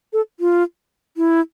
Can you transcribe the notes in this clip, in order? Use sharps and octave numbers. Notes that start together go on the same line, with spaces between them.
A4
F4
E4